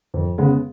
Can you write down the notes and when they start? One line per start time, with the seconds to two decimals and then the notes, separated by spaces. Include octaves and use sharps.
0.14 F2
0.38 C#3 G#3 B3